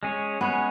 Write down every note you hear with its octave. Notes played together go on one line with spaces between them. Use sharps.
G#3 C#4 G#4 C#5
G#3 B3 C#4 G#4 C#5